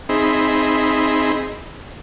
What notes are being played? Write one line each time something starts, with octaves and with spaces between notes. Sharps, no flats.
C4 D#4 G#4 E5 B5 C6